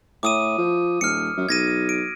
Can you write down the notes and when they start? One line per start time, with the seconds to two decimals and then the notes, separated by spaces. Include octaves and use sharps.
0.23 A2 D6 D#6 D#7
0.58 F3
1.01 D#1 F6 C#7
1.37 F#2
1.49 B1 G#6 A#6 D#7
1.89 D7